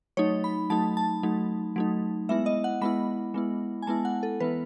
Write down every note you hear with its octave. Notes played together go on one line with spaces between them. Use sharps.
F#3 A3 D#4 C#5
B5
F#3 A3 D#4 A5
A5
F#3 A3 D#4
F#3 A3 D#4
G#3 B3 E4 E5
D#5
F#5
G#3 B3 E4 B5
G#3 B3 E4
G#5
G#3 B3 E4 A5
F#5
A4
E3 B3 E4 B4